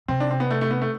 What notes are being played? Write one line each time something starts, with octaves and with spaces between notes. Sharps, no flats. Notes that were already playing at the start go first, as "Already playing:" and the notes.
C3 C4
D4
C4
B3
A3
A3
B3
A3